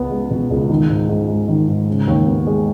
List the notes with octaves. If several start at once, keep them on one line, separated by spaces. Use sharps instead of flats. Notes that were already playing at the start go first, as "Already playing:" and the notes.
Already playing: C#2 B3
G#3
B2
C#2
D#3
G#2
G#2
G#3
D#3
G#2
C#3
D#2
B3
G#3